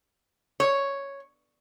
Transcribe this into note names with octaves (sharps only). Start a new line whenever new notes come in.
C#5